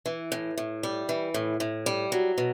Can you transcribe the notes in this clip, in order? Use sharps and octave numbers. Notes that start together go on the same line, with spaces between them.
E3
A2
A2
G3
E3
A2
A2
G3
F#3
B2